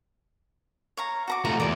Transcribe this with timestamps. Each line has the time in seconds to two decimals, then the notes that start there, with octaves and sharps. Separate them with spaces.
0.97 C#5 F5 A#5
1.28 F#4 A#5 D6
1.45 F3 A3 A#5
1.60 E2 G#4 A#4 D5